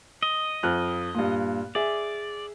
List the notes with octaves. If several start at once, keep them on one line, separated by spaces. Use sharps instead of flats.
D#5
F2 F6 F#6
G2 A#2
G#4 D5 E5